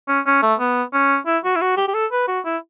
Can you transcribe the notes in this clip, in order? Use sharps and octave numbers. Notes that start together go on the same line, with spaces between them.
C#4
C#4
A3
B3
C#4
E4
F#4
E4
F#4
G4
G4
A4
B4
F#4
E4